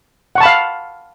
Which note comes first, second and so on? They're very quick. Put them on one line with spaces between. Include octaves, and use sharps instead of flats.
F#5 C#6 A5 B5 F5